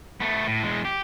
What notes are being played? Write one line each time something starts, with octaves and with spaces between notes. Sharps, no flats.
A3 B3
A2
E2 G#3
G4